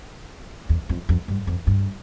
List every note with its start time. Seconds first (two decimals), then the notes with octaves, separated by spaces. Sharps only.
0.69 E2
0.89 F2
1.09 F2
1.28 G2
1.47 F2
1.67 G2